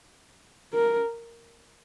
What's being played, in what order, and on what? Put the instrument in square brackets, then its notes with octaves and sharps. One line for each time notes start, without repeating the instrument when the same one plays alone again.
[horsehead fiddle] A#4